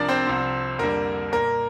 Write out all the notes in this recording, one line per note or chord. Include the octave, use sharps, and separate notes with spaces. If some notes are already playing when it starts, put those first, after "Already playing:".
Already playing: C2 C3 F3 D4 A#4 D5
C4 C5
C2 C3 F3 C4
F2 D3 G3 A#3 A#4
A#2 A#3 A#4